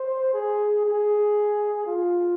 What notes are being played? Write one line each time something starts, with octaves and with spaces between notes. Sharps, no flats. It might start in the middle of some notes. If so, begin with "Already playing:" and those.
Already playing: C5
G#4
G#4
F4